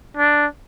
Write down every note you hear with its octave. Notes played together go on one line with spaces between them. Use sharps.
D4